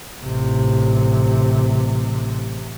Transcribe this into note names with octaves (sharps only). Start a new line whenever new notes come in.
A1 C3